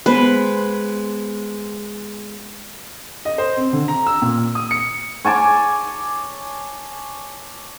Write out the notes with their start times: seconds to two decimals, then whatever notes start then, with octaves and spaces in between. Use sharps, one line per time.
0.06 G#3 B3 B4 C5
3.25 D#5
3.38 C5
3.57 C4
3.73 D3
3.88 A#5
4.06 E6
4.22 A#2
4.55 D#6
4.71 C#7
5.25 C#5 G#5 A5 D6